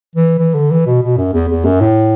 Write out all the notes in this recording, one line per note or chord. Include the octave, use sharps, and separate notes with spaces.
E3
E3
D3
E3
B2
B2
F#2
E2
E2
F#2
A2